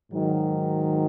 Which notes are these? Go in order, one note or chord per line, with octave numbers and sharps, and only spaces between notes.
G#2 D#3 F#3